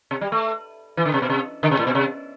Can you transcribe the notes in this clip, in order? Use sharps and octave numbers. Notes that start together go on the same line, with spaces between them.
C3
G3
A3
E3
D3
C3
B2
C3
D3
C3
A2
B2
C3